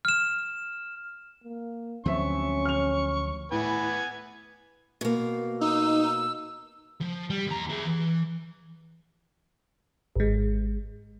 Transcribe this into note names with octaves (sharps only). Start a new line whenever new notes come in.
F6 E7
A#3
D2 F3 F#3 C4 C#4 E5 C#6
F6 F7
A2 B3 B4 G#5
B2 A#3
D#4 E6
F3
G3
D#2 A#5
E4 G#4
E3
G#1 G#3